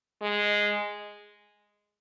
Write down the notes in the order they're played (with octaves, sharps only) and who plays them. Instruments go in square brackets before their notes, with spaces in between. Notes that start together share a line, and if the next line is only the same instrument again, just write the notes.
[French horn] G#3